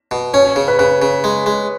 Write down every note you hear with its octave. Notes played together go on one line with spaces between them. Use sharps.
B2
C#4 C#5
C#5
C#3
B4
C#3 B4
C#3
G#3
G#3